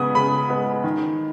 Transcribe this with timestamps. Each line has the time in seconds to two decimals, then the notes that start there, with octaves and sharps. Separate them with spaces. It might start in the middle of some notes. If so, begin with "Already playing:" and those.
Already playing: C#3 G#3 B3 D#6
0.15 C#3 B5
0.49 G#3 B3
0.84 D#3